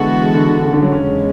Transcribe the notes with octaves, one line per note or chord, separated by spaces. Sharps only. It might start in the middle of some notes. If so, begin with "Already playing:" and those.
Already playing: D3 E3 G#3 B3 F#4 A4
D3
D3
C#3
D3
F#3
E2 C#3 G#3 C#4